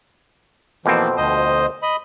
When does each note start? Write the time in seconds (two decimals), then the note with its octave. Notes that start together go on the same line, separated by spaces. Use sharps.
0.86 F2 B2 E3 F3 A#3 C4
1.17 D2 C5 D#5
1.83 D#5 B5